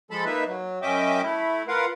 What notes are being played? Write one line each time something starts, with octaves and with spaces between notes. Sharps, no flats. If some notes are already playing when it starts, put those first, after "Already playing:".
F3 G#3 A4 A5 B5
A#3 D#4 B4 E5
F#3
F#2 C#4 D#5 E5 G5 D6
A3 E4
F4 A#4 B4 F5 F#5